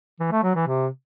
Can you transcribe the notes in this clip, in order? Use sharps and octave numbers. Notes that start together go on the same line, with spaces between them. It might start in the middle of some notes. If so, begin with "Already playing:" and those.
E3
A3
F#3
E3
C3